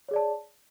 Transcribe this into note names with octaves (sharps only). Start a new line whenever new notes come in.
G#4 C#5 D5 A5